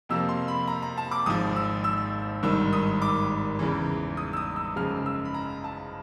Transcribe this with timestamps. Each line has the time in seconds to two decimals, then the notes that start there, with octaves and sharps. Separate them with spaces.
0.09 F2 C3 F3 A#3 E6
0.29 C6
0.48 B5
0.68 A#5
0.82 A#5
0.98 A5
1.11 D6
1.26 G#1 G#2 F3 D#6
1.56 E6
1.84 E6
2.43 G#1 G2 D#3 E6
2.73 D#6
3.02 D6
3.59 E2 C#3 E3
4.17 D#6
4.33 E6
4.37 D#6
4.56 E6
4.76 F#2 C#3 F3 G#3 F6
5.06 E6
5.25 B5
5.34 A#5
5.64 A5